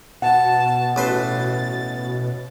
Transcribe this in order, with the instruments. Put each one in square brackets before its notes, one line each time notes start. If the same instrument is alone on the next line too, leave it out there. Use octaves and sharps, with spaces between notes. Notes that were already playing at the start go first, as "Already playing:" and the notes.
[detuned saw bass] B2 [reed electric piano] F#5 [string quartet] A5
[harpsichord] A1 B4 C6 [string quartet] A6